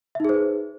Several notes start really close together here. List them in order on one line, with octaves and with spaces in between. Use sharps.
E5 D#4 G#4 C5 B4